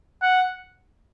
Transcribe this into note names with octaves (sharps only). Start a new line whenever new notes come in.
F#5